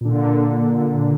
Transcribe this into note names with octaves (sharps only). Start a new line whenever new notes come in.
A#2 D3